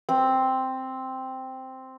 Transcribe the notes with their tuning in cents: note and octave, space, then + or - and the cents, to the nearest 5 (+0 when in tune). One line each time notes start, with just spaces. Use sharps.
C4 +0